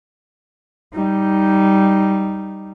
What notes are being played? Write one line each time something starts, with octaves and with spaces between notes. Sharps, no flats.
G3 D#4